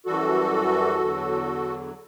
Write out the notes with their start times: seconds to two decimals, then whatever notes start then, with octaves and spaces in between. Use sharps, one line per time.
0.06 F#2 E3 G3 F#4 A4
1.00 E2 D3 F#3